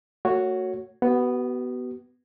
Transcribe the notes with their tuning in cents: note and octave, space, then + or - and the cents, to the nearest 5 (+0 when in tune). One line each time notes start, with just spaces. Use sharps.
A3 +40 F#4 +0 C#5 +0
B3 +0 F#4 +45